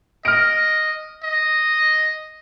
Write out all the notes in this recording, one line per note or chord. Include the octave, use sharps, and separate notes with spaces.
D#5 F6 D7
D#5